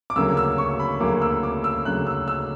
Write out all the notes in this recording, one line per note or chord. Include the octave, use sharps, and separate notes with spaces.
D6
D2 C#3 F#3 A#3 E6
E6
C#6
B5
D2 C#3 F#3 A#3 D6
E6
D6
E6
D2 C#3 F#3 A#3 F#6
E6
E6